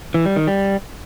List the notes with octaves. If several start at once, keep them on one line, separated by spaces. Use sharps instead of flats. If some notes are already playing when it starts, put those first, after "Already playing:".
E3
G3
D#3
G3